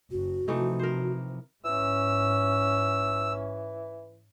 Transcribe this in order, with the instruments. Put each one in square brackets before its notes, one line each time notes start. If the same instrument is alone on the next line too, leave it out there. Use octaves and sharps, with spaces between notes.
[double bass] F#1 [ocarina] F#4
[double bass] C3 F3 [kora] E3 A3 D#4
[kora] A#4 C5
[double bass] G#2 C#4 [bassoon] E3 [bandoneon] E6